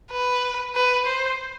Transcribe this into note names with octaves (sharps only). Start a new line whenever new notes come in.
B4
B4
C5